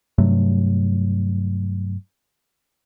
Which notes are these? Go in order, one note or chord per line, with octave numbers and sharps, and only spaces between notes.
G2 C3 F#3 A3